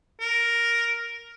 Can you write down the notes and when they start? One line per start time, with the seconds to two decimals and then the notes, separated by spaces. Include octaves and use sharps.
0.21 A#4